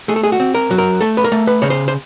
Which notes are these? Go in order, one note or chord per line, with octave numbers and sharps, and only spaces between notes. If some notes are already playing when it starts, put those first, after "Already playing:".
A3 G#4
A4
G#4
F#4
C4
A#4
F#3
A#4
A3 A4
B4
A#4
A3
B4
C#3 C#5
C5
C5